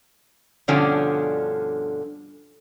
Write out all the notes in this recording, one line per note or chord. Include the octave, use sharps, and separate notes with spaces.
G2 B2 D3 F3 C#4 D4